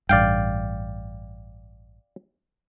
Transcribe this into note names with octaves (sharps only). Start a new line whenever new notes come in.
A1 G2 D5 F5 G5